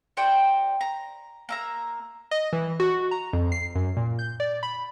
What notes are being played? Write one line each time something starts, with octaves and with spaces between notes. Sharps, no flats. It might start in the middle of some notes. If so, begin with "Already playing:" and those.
F#4 C5 D5 G5
A#5
A#3 E5 A#5
D#5
E3
F#4
A#5
F2
C7
F#2
A#2
G6
D5
B5